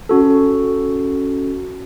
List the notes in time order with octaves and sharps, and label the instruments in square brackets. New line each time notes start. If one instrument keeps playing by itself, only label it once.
[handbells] C#4 F#4 A4